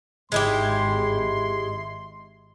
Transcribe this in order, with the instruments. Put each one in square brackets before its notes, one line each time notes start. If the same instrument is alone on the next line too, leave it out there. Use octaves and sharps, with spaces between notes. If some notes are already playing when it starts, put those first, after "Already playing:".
[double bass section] G#1 [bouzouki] G#3 E4 G4 [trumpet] C6